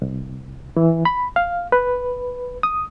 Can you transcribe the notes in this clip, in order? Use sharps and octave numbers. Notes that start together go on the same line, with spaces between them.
C2
E3
B5
F5
B4
D#6